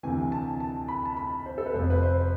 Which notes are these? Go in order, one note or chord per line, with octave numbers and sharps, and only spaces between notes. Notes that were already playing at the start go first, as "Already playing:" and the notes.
D2 C3 E3 G#5
A5
A5
B5
A5
B5
C5
A4
B4
F1 F2 C3 C5
B4
C5